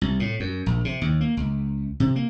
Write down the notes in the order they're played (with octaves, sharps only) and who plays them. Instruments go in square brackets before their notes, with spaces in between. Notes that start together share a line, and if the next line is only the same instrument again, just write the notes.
[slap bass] C2
A2
F#2
A#1
C3
D#2
A#3
C#2
C3
A#3